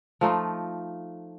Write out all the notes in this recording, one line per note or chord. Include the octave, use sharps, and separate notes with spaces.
F3 A3 D#4 F4